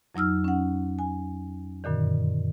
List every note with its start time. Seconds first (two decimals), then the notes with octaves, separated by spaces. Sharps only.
0.15 F2 F#3 D#4 E6 F6
0.44 C#4 F#5
0.99 G#5
1.84 F#2 A#2 D3 D#3